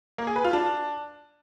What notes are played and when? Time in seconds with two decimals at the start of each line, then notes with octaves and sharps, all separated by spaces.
0.18 A#3
0.27 G#4
0.36 B4
0.44 F4
0.53 D4